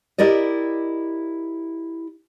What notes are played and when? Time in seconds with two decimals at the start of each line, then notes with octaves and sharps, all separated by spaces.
0.18 E4 G4 A#4 D5 D#5